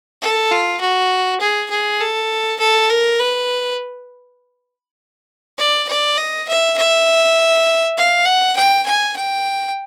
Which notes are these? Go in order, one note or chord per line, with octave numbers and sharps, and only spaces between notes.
A4
F4
F#4
G#4
G#4
A4
A4
A#4
B4
D5
D5
D#5
E5
E5
F5
F#5
G5
G#5
G5